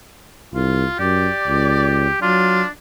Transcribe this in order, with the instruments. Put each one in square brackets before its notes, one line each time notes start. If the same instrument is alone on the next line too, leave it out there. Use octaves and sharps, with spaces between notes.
[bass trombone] C2 [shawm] F4
[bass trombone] F#2 [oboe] G4 [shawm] D5
[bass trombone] C#2
[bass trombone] F#3 [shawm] D4 [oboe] F4